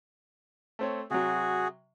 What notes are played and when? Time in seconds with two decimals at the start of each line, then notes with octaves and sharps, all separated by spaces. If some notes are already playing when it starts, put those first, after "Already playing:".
0.79 A3 C4 C#5
1.11 C3 F#3 F#4 G#4